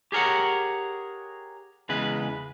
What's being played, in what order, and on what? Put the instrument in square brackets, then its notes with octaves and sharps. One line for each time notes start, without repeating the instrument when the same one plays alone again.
[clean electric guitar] G4 G#4 A#4 C#5 F#5
E2 C#3 G#3 B4